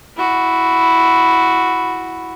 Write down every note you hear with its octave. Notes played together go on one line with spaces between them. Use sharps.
E4 F#4